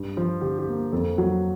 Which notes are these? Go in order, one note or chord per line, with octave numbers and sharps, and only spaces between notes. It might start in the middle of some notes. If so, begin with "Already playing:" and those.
Already playing: G2
F3
D3 G4
G4
A#3
F2 A4
F#3